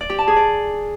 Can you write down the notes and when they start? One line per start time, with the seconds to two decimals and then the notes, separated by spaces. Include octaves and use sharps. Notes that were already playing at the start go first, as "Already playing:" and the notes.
0.01 D5
0.10 G4
0.19 A5
0.27 G#4
0.36 D5